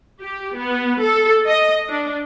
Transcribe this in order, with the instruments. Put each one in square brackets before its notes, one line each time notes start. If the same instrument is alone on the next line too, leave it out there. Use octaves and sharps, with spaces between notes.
[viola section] G4
B3
A4
D#5
D4